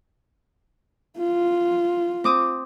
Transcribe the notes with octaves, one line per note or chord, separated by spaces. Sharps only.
F4
C4 D6 D#6